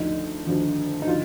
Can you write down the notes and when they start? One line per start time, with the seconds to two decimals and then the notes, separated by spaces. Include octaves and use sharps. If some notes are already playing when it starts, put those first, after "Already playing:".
Already playing: D2 D3 F3 D#4
0.47 D2 D3 F3
1.02 D#4
1.07 D3 F3 F4